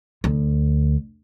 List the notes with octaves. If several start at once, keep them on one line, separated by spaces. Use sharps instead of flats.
D2